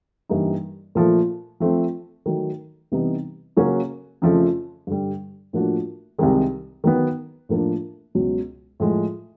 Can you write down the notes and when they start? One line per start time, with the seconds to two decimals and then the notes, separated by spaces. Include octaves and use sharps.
0.29 G2 E3 G3 A#3 D#4
0.95 A#2 F3 A3
1.60 F3 A3 C4
2.26 D#3 F#3 A3
2.92 C3 E3 G3 B3 D#4
3.57 C#3 F#3 A#3 C#4 F#4
4.22 F2 C#3 F3 A3
4.87 G2 D3 G3
5.53 A2 F3 A#3 D4 F#4
6.18 C2 C3 D#3 G#3
6.84 D#3 F#3 B3
7.49 A2 F3 A#3 D4
8.15 C#2 B2 F#3
8.80 A2 F3 G#3